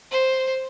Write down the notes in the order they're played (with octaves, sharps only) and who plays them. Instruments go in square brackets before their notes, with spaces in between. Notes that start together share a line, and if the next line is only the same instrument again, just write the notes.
[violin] C5